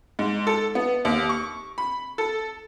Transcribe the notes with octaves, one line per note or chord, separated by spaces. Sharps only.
G#2
A4
B3
D#2
C#6
B5
A4